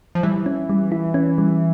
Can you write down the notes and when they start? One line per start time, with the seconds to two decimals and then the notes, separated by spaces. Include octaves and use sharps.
0.15 F3
0.23 E3 G3
0.46 C#4
0.70 G3
0.92 E4
1.14 C#4
1.38 G3